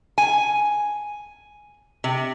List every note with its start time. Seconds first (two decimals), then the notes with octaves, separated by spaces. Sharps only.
0.18 G#5
2.04 C3